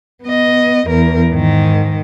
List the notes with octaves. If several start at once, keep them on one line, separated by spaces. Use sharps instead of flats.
B3 D#5
E2 A#4
G#2 D#3